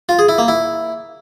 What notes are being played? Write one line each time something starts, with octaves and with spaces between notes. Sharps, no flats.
F4
G#4
E4
A#3
E4